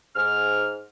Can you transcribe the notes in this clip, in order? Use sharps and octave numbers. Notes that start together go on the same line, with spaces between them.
G#2 F6